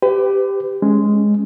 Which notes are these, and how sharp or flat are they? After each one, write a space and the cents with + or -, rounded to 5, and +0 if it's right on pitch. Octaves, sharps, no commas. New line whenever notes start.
G4 +5 B4 +40
G#3 +0 C#4 +0